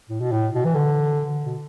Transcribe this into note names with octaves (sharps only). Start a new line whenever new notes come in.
A2
B2
A2
B2
E3
D3
B2